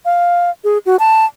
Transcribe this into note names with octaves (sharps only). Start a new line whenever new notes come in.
F5
G#4
F#4
A5